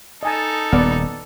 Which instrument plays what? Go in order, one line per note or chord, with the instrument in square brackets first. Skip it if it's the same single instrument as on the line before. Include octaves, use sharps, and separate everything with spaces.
[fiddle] D#4 A4 [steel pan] D#5 G#5 A5
[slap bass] D#1 [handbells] B3 [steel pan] B4 D5 F#5